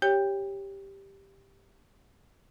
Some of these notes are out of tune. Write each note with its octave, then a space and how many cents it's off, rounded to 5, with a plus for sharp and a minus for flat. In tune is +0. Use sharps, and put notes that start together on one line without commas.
G4 +0 C#5 +0 G5 +20